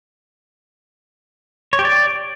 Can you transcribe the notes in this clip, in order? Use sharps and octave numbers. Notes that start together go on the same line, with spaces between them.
C#5
G4
D5